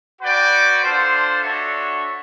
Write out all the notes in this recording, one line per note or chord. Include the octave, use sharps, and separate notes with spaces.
F#4 B4 D5 G5
D4 F4 A4 C5
D4 F#4 A4 C#5 E5